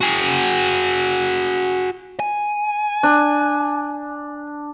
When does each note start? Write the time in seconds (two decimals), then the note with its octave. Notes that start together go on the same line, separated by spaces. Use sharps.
0.01 F#4 G#4
2.20 G#5
3.03 D4